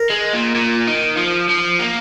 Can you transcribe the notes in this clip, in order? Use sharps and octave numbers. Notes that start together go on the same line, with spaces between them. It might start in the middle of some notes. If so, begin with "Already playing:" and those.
Already playing: A#4
G#3
A#2
A#2
D#3
F3
F3
A#3